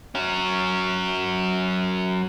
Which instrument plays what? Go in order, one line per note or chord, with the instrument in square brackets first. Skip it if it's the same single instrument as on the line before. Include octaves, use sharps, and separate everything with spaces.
[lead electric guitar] F#3 C#4